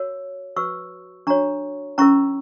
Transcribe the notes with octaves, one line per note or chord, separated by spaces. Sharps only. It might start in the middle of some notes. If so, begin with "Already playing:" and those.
Already playing: F#4 A#4 C#5
F#4 B4 C#6 E6
D4 F#4 C#5 A#5 C#6
C#4 E4 A#4 A#5 C#6